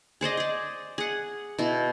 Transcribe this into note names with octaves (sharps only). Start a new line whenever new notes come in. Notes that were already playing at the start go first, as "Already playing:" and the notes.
G#4 C5 D5 D#5
G#4 D5
G#4 F#5
B2 E4